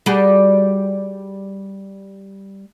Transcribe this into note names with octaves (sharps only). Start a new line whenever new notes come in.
G3 F#4 G#4